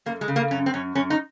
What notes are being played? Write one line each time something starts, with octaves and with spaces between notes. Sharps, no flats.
F#2 A#3
G#3
C#3
A#3
F#2 C#4
C4
F#2 C#4
F#2 C#4
D#4